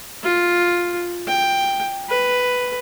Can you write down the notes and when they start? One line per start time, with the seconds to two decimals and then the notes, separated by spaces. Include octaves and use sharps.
0.23 F4
1.28 G5
2.09 B4